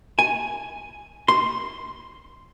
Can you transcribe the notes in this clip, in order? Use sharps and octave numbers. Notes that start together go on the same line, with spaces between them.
G#5
C6